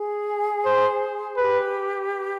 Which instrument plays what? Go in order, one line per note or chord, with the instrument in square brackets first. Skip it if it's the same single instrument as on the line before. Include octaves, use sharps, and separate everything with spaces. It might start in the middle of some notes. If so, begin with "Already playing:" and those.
Already playing: [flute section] G#4
[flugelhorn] C5
[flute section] G4 [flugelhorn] B4